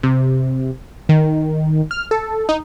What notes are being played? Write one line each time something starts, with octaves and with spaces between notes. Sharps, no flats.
C3
D#3
F6
A4
D#4